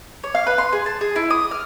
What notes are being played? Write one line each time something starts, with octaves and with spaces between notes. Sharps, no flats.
C#5
F5
B4
C6
G#4
A5
G#4
E4
D#6
F6